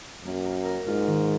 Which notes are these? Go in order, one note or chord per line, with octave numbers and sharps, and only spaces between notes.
F#2 A#3
A#4
A#4
G#2 F4
D#3